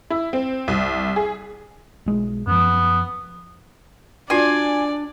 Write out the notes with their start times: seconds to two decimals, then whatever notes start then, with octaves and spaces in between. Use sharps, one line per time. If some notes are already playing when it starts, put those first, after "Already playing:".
0.10 E4
0.33 C4
0.68 C2
1.16 G#4
2.06 B1 G#3
2.47 F#2 F3 B3
4.30 D4 F4 F#4 D5 G#5